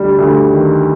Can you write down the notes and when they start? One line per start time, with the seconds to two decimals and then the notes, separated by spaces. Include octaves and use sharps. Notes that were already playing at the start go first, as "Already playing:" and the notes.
Already playing: D2 G3
0.18 D2
0.51 D#3